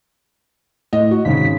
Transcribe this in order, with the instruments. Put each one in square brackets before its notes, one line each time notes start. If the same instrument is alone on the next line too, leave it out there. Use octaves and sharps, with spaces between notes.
[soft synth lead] A2 [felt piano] D#5
[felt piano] F#4
[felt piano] G#1 C#3 [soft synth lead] B6